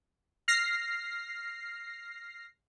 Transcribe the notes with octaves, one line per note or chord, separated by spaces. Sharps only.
F6 A#6 C7